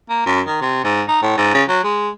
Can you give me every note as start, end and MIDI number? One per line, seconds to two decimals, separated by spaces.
0.09 0.21 58
0.26 0.41 42
0.47 0.61 51
0.61 0.82 48
0.84 1.03 44
1.08 1.21 63
1.22 1.33 45
1.37 1.54 44
1.54 1.63 49
1.68 1.84 54
1.84 2.09 56